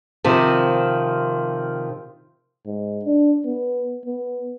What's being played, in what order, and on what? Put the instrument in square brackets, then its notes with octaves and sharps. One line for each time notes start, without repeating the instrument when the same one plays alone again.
[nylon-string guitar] C3 D#3 F3
[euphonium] G#2
D4
B3
B3